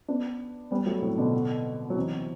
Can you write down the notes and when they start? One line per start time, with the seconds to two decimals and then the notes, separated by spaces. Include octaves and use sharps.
0.08 B3 D4
0.71 G3 B3
0.86 F#3 A3
1.02 A2 C3
1.18 B2 D3
1.90 F#3
1.96 C3 E3